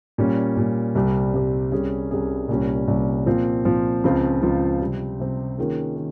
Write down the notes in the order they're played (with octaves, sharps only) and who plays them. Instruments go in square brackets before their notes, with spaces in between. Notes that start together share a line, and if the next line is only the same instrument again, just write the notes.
[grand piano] A#2 G3 C#4
A#2 G3 C#4
C2 C3 G3 C4 G4
C2 C3 G3 C4 G4
C2 C3 G3 C#4 G#4
C2 C3 G3 C#4 G#4
C2 A#2 G3 C#4
C2 A#2 G3 C#4
A#2 F3 C4
A#2 F3 C4
C#2 C#3 F3 C4 F4
C#2 C#3 F3 C4 F4
C3 G3 C4
C3 G3 C4
D#3 A#3 C#4 F4 G#4
D#3